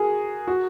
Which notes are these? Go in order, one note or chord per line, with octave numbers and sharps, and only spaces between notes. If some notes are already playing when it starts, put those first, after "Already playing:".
Already playing: F#4 G#4 A#4
F#4